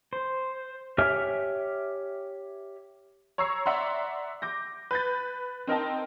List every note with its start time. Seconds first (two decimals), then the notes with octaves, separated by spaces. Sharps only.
0.13 C5
0.98 G4 C#5 E5 G#5 F6
3.38 C#5 A#5 C#6 E6 C7
3.66 D5 E5 F#5 A#5 C6
4.42 D6 G6 A#6
4.91 B4 G6 A6
5.67 C4 D#4 A#4 D#5 G5 A5